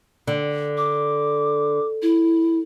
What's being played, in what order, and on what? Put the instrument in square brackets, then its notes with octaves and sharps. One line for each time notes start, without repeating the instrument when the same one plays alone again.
[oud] D3
[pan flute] D6
E4